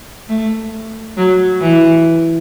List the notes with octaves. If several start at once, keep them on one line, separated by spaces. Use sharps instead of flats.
A3
F#3
E3